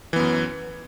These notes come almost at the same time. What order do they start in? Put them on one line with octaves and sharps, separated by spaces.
E3 B3 F#2